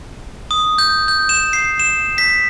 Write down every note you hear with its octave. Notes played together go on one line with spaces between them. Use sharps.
D#6
G6
G6
E7
C7
E7
B6